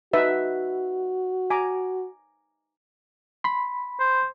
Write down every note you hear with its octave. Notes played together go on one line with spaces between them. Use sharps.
D#4 F#4 B4 E5
G#5 A#5 D6
B5 C6
C5